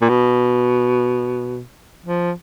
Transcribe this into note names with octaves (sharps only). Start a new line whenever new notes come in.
A#2
B2
F3